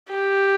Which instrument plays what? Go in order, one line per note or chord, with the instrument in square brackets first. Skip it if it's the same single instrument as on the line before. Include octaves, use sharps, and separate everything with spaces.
[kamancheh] G4